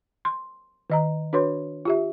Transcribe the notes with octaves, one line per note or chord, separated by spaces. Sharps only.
C6
D#3 D#5 A#5
D4 F#4 B4 C#5 C6
F4 G4 E5